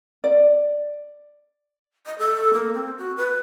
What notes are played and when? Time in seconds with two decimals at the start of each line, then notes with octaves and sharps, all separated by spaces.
0.24 D5
2.06 D#5
2.18 A4
2.53 A#3
2.74 C4
2.98 F#4
3.17 B4